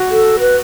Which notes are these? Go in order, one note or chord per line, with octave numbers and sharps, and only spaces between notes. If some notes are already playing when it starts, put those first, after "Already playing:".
Already playing: F#4
A4
B4